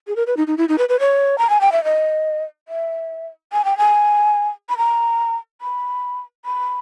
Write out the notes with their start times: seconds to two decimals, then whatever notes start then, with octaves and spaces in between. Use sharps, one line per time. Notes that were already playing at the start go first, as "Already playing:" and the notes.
0.07 G#4
0.16 A#4
0.27 B4
0.37 D#4
0.47 D#4
0.57 E4
0.68 D#4
0.78 B4
0.89 B4
1.00 C#5
1.38 A#5
1.49 G#5
1.61 G5
1.72 E5
1.84 D#5
2.68 E5
3.52 G#5
3.65 G5
3.77 G#5
4.69 B5
4.77 A#5
5.61 B5
6.45 B5